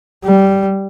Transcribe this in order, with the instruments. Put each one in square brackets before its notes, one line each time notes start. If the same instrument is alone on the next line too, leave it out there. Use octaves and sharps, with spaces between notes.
[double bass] G3